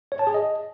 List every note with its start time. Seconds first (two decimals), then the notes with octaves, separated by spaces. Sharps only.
0.12 C#5
0.19 A5
0.27 G#4
0.34 D#5